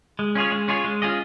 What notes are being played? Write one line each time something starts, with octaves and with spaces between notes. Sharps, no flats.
G#3
C#4 F4 G#4 C#5
G#3
C#4 F4 G#4 C#5
G#3
C#4 F4 G#4 D#5